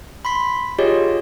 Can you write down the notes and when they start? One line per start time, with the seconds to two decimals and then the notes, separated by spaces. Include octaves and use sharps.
0.25 B5 C6 B6
0.78 F4 G4 G#4 C#5 D#5